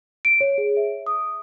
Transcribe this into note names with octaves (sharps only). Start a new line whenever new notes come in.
D7
C#5
G#4
E5
D#6